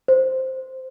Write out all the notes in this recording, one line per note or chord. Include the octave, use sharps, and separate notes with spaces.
C5